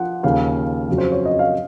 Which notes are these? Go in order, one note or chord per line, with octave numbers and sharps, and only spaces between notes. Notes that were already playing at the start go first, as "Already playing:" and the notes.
Already playing: F3 F#5
D#2 C#3 F3 F5
F2 C#3 F#3
C5
C#5
D#5
F5